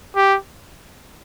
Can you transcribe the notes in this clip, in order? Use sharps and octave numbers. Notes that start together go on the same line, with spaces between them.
G4